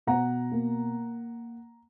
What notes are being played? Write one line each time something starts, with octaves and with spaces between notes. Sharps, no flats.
B2 F#5 A#5
A#3